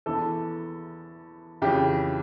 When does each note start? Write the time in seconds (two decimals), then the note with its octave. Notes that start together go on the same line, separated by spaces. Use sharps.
0.06 E2 E3 A4
1.62 F2 C#3 E3 G4